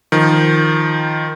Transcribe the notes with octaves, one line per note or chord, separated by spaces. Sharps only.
D#3 F3